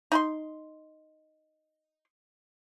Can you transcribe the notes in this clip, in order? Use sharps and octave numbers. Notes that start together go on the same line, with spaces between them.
D#4 B5 C6